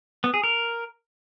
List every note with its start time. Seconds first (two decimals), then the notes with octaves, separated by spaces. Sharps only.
0.24 B3
0.34 G#4
0.44 A#4